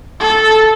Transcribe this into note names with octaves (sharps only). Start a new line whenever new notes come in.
A4